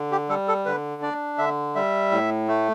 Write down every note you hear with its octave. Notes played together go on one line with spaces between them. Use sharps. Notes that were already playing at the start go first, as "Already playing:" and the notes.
Already playing: D3
G4
G3 A4
A4
D3 B4
D4 D5
D3 E5
G3 E5
A2
A3